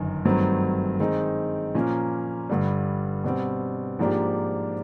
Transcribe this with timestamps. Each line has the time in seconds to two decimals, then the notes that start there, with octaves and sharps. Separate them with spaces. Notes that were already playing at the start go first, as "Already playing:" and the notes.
Already playing: G1 F#2 D#3
0.25 G2 D#3 F#3 A3 C4
1.00 D#3 G#3 C4 D#4
1.75 A#2 F3 A#3 C#4
2.50 G1 G2 D3 G3
3.24 B2 G3 C4
3.99 G#2 F3 A#3 D4 G4